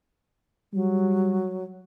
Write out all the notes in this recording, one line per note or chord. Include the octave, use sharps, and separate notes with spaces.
F#3 G3